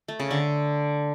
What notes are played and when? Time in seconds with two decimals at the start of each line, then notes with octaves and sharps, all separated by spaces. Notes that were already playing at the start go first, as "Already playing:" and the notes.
0.08 A3
0.20 C#3
0.31 D3